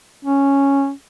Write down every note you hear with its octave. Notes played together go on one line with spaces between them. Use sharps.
C#4